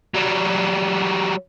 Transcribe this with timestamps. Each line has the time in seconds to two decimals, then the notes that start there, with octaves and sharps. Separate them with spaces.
0.14 F#3 G3